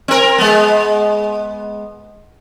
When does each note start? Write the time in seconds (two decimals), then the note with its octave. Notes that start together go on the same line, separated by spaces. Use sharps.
0.08 C4 A#4
0.38 G#3 B3